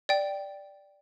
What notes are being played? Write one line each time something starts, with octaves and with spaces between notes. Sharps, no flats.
D5 G5